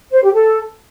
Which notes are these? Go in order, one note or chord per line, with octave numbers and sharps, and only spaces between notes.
C5
G4
A4